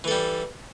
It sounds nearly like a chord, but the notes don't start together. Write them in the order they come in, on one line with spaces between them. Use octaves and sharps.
E3 A4 G3